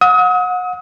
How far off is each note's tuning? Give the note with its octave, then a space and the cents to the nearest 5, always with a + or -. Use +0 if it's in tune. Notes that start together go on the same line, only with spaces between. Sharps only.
F#5 -30 D#6 +40